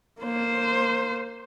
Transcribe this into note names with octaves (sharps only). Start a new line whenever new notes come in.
A#3 C5